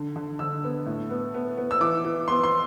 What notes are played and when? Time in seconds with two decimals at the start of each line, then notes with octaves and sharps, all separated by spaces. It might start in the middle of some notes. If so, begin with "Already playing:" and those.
Already playing: D3
0.16 D3
0.39 D3 E6
0.63 B3
0.86 A2
1.10 B3
1.34 B3
1.57 B3
1.71 E6
1.81 E3 D6
2.04 E3
2.28 B3 C6
2.44 C6